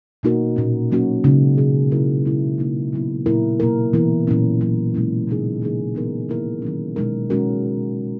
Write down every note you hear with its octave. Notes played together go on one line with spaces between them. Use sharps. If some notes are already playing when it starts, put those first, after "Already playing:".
B2 A#3 D#4 F#4 A#4
A#2 A#3 C#4
A#2 F#3 A#3 C#4 F#4
C#3 G#3 D#4
B2 F#3 C#4 G#4
F#3 A#3 E4 A#4
B2 G#3 C#4 E4
B2 A#3 D#4
A#2 F#3 B3 E4
A#2 F#3 A#3 E4 A#4
B2 A#3 E4 A#4
E3 B3 E4 A#4
A#2 F#3 A#3 C#4 E4
A#2 F#3 C#4
B2 G#3 C#4 E4
C#3 G#3 D#4 G#4
C#3 E3 A#3 D#4 G#4
E3 B3 D#4 A#4
D#3 A#3 E4 A#4
D#3 F#3 C#4
B2 G#3 D#4 A#4
G#3 C#4 F#4 A#4